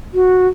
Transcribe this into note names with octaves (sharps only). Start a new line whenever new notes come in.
F#4